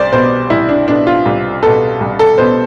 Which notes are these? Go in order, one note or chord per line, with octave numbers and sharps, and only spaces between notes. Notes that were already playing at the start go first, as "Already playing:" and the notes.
Already playing: C2 C5 D5
B2 B3 C5
C2 E4
D4
B2 B3 D4
F4
C2
B2 B3 A4
C2
A4
B2 B3 C5